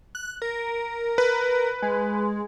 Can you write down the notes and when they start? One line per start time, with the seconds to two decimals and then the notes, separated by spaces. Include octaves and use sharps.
0.15 F#6
0.42 A#4
1.18 B4
1.82 G#3